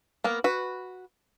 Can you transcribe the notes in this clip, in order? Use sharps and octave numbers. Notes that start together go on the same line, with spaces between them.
A#3 B3 A#4
F#4 B4